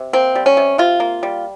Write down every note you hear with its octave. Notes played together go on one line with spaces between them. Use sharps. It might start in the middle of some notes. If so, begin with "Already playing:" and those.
Already playing: C3
A#3 C4
G3
C#4
C3
C3 F4
A#3
G3